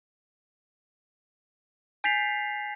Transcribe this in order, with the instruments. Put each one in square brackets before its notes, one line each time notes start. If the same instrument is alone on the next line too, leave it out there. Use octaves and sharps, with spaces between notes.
[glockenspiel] G#5 G6 A6 B6 C7 F7